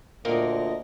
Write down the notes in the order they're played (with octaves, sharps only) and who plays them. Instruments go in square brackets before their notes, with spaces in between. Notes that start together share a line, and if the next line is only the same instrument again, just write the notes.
[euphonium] D2 [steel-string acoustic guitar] A#2 [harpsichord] A#3 C4 A#4 [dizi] D#5